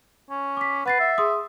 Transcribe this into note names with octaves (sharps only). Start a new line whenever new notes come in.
C#4
D6 B6
B4 F#5 A6 C7
E5
G#4 C6 D#6